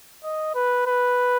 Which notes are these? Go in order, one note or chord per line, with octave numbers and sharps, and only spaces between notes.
D#5
B4
B4